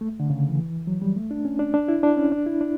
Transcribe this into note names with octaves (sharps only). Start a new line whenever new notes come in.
A3
D3
C#3
E3
F#3
G3
A3
D4
C#4
D4
D4
E4
D4
C#4
D4
E4
D4